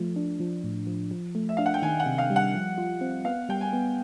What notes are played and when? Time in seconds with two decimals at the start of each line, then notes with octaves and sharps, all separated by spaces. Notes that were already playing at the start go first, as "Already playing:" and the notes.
Already playing: F3 A3
0.16 D4
0.40 F3
0.64 A2
0.87 F3
1.11 F3
1.35 A3
1.49 E5
1.57 D4 F5
1.66 F#5
1.74 G5
1.82 D#3 G#5
2.00 F#5
2.06 C3
2.18 F5
2.30 G3
2.36 F#5
2.54 F3
2.78 F4
3.01 C4
3.25 B3 F5
3.49 G3 G5
3.61 G#5
3.73 B3